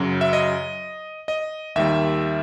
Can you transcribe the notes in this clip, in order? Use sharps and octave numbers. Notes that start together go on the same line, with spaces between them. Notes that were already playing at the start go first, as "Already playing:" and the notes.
Already playing: F#2 C#3 F#3
E5
D#5
D#5
D#2 D#3 G3 E5